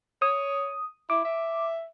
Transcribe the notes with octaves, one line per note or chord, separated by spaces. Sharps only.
C#5 D#6
E4 D6
E5